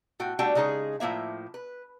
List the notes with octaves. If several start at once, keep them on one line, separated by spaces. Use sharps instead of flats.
A2 F#4 G5
G3 A3 D4 F#4 G5
C#3 G#3 D#4 G#4 C#5
A2 F3 A#3 E5
B4